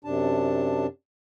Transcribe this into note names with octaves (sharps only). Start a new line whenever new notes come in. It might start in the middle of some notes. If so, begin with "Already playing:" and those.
F#2 C3 D4 A5